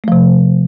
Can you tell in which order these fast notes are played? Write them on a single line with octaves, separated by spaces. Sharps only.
A3 F3 C3